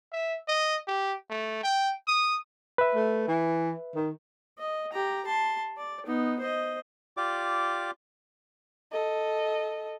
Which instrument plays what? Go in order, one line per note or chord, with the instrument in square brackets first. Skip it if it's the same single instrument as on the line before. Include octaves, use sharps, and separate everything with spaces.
[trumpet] E5
D#5
G4
A3
G5
D#6
[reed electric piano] B4 E5
[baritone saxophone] A3
E3
D#3
[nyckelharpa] D#5
G4 A#5
A5 C6
D5
B3 D#4
C5 D#5
[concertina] F4 G4 D5 D6
[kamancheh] A4 D#5